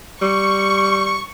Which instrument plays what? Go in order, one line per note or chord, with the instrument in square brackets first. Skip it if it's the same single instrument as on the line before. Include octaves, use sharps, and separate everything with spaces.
[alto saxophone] G3 [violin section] C#6